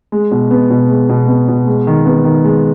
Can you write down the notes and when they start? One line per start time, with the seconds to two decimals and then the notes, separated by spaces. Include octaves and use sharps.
0.12 G#3
0.31 B2
0.51 B3
0.70 B2
0.89 G#3
1.09 B2
1.28 B3
1.48 B2
1.67 G#3
1.87 D#3
2.06 B3
2.25 D#3
2.44 G#3